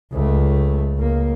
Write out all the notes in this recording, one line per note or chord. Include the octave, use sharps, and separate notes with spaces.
C#2 A3
C#2 A#3